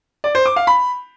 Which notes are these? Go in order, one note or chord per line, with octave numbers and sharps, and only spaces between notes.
D5
C5
D6
F5
B5